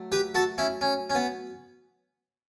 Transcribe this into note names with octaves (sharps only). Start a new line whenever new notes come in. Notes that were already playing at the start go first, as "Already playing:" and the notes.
Already playing: F#3 A3
G4 B4
F#4 A4
C#4 E4
C#4
C#4
B3